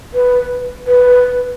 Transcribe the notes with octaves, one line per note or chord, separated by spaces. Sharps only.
B4
B4